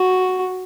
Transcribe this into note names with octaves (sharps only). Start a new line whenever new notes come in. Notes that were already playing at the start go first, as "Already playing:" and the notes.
Already playing: F#4